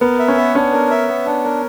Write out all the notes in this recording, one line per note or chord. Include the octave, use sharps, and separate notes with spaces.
B3 A#4
E5
C#4
B3
C#4 D4
A#4
E5
B3
D4
A#4